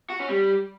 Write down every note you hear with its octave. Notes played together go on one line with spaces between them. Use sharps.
F#4
C#4
G3